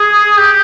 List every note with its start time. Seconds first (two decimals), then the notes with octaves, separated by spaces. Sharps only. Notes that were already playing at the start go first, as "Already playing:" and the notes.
Already playing: G#4
0.37 G4